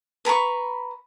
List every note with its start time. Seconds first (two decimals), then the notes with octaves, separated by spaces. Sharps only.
0.25 B4 A#5 B5 C#6